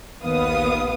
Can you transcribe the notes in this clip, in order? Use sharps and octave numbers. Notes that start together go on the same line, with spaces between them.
A#1 D#2 B3 F5 D#6